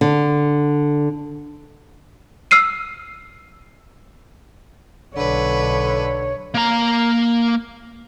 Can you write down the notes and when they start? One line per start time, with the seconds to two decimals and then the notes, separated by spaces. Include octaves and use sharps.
0.01 D3
2.51 E6 F6 C7 D#7
5.17 B1 D3 B4 C#5
6.54 A#3 A#5